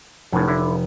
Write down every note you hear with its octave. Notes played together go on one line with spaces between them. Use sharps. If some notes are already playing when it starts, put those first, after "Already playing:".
F1 F#2 A2
D3 E4